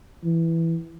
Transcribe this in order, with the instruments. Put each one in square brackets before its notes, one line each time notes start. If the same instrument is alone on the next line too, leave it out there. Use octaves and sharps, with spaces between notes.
[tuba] E3